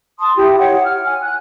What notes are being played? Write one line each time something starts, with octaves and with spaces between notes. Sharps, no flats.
A5 C6 D#6
E4 G4 G5
C#5 F#5 G5
F6
G#5
F#6